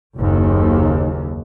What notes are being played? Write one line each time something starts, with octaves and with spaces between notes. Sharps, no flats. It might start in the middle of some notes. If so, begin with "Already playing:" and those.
F#1 D#2